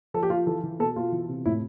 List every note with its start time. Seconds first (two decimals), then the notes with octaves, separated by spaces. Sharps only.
0.14 F3 A4
0.23 G4
0.30 F3 F4
0.47 E3 A4
0.63 E3
0.79 B2 A4
0.96 B2 F4
1.12 E3
1.29 C3
1.45 A2 E4